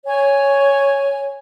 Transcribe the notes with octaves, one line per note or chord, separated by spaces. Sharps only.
C#5 G#5